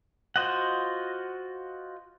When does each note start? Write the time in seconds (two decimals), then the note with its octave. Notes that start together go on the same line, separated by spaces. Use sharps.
0.36 F4 F#4 C5 D#5 F#5